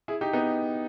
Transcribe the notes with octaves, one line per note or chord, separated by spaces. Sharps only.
E4 G#4
D#4 G4
B3 D#4